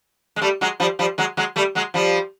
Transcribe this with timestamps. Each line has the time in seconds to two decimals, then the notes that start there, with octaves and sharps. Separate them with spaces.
0.36 G#3
0.42 G3 A3
0.61 F#3 G#3
0.80 F3 G3
0.99 F3 G3
1.18 F#3 G#3
1.37 F#3 G#3
1.56 G3 A3
1.75 F#3 G#3
1.94 F3 G3